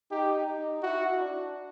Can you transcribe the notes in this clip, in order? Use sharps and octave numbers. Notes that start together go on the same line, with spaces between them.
D#4 G4
D#4
E4 F#4
D4